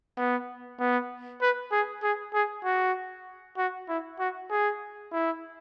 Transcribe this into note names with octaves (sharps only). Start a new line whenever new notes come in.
B3
B3
B4
G#4
G#4
G#4
F#4
F#4
E4
F#4
G#4
E4